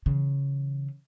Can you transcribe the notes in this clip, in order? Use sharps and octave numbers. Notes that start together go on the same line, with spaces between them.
C#3 E3